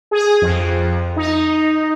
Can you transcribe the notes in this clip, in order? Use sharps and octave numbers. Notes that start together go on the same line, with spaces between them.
G#4
F2
D#4